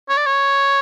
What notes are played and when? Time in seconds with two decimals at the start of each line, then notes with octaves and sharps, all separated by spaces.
0.09 C#5
0.17 D5
0.26 C#5